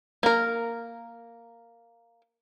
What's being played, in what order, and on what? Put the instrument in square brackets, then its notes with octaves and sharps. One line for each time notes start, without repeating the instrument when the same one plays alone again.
[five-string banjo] A#3 A#4